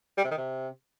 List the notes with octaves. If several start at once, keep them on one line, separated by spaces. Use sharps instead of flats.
G3
C3
D#3
C3